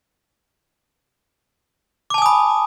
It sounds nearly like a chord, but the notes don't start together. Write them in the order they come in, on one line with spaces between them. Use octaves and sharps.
D6 A5 G#5 D#6 B5